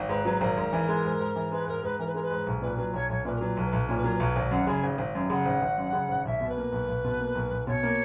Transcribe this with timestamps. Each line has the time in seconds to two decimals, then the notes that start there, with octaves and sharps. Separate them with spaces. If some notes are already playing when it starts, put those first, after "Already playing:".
Already playing: G#1
0.09 G#2 B4
0.25 F#3 B4
0.41 G#1 A#4
0.57 G#2
0.73 E3
0.88 G#3
1.05 G#2
1.20 G#2
1.36 E3
1.51 G#3 B4
1.67 G#2 A#4
1.83 G#2 B4
1.99 E3 A#4
2.06 B4
2.14 G#3 A#4
2.22 B4
2.31 G#2
2.47 B1
2.62 A#2 B4
2.78 F#3 B4
2.94 B1 C#5
3.09 B1 C#5
3.25 A#2 B4
3.35 A#4
3.41 F#3 B4
3.57 B1
3.65 B4
3.73 B1
3.88 A#2 C#5
3.96 B4
4.04 F#3 A#4
4.14 B4
4.20 B1
4.36 G#1
4.51 F#2 F#5
4.67 C#3 G#5
4.83 G#1
4.98 G#1
5.15 F#2
5.30 C#3 F#5
5.46 G#1
5.62 G#1
5.78 F#2
5.93 C#3
6.09 G#1
6.25 B1 E5
6.41 B2
6.48 B4
6.57 A#3
6.72 B1
6.88 B1
7.04 B2
7.19 A#3
7.35 B1
7.51 B1
7.67 B2 C#5
7.83 A#3